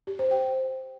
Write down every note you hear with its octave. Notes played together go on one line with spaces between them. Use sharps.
G4
C5
G5